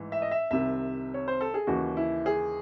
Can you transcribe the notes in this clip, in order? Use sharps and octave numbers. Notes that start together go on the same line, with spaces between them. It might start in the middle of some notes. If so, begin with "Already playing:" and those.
Already playing: A1 G#2 E3
E5
D#5
E5
C2 C3 D#3 E5
C#5
C5
A4
G#4
D#2 C#3 E3 F#4
E4
G#4